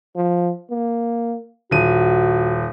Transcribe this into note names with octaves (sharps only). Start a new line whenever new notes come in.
F3
A#3
D#1 F#4 D#7